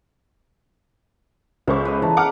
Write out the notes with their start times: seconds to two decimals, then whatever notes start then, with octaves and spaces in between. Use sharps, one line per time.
1.67 C#2 C#3 C5 E5 C#6 D6
1.85 B4 D#5
2.02 E3 B4 A5 A#5
2.17 F#5 D6 F6